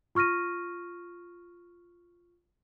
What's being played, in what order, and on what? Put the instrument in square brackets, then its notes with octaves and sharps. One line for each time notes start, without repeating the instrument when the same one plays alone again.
[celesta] F4 C#6 F6 A#6 D#7